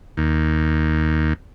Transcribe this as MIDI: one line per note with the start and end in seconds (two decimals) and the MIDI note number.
0.17 1.33 39